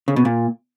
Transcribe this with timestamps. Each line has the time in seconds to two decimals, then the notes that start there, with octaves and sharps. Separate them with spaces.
0.08 C#3
0.16 B2
0.25 A#2